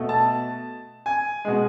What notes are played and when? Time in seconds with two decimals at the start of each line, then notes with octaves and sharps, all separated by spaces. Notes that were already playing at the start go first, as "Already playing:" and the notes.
Already playing: B2 A3
0.09 A5
1.06 G#5
1.45 B2 G#3